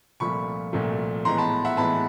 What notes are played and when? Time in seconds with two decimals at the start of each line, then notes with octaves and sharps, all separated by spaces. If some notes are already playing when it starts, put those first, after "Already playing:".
0.20 C2 A#2 F3 A3 B5 C#6
0.73 C2 A#2 F3 A3
1.25 A2 E3 G#3 B3 A#5 C6
1.38 A5 B5
1.65 E5 F#5
1.77 A2 E3 G#3 B3 A5 B5